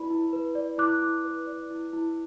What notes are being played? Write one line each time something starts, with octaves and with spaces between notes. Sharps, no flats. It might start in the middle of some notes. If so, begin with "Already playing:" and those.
Already playing: E4 B4 D5 B5
E4
B4
D5
E4 D6 F#6
E4
B4
D5
E4
E4